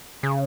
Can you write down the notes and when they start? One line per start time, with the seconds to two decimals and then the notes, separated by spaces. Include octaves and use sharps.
0.23 C#3